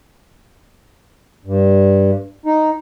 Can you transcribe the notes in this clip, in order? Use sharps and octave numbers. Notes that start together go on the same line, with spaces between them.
G2
D#4